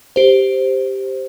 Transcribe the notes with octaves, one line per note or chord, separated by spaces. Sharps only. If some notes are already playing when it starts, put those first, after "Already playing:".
G4 C5